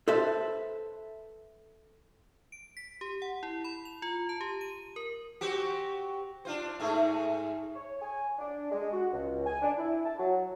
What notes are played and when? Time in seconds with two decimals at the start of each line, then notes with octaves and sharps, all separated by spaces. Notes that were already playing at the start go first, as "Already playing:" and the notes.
0.08 A4 B4 C5 E5
2.52 D7
2.77 B6
3.01 G4
3.22 F#5
3.43 E4
3.64 B5
3.85 F7
4.02 F4
4.29 A5
4.41 G4
4.61 D#7
4.96 A#4
5.41 C4 F#4 G4
6.45 D4 F4 C5
6.80 G#2 A3 G#4
7.75 C#5
8.02 G#5
8.39 D4
8.72 G#3
8.93 F#4
9.13 C#2
9.46 G#5
9.62 D4
9.78 E4
10.06 A5
10.19 F#3